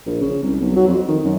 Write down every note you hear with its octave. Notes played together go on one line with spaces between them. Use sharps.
A#1
C#3
C2
B1
F#3
F2
D#3
F#2